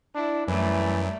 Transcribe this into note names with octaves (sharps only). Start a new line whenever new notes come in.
D4 E4
F#2 E3 G3 A3